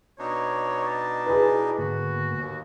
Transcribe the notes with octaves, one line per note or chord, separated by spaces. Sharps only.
B2 D4 D#4 C#5
A5
E4 G#4 B4
G#2 D3 A#3 F#4
D#2